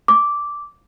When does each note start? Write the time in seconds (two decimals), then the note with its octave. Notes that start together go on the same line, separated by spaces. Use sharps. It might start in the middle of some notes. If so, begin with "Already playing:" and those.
0.08 D6